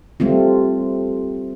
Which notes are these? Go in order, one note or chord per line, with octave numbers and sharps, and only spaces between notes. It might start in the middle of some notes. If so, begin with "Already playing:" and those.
G3 A3 C4 F4